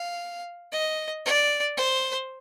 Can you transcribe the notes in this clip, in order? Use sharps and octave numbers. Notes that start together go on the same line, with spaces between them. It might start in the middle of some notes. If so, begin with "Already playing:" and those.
Already playing: F5
D#5
D5
C5